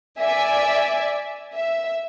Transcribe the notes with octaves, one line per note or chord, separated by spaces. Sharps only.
D5 E5 G#5
E5